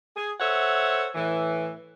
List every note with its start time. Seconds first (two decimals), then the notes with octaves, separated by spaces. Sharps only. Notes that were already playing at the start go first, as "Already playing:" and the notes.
0.16 G#4
0.40 A4 C5 C#5 E5 F#5
1.15 A2 E3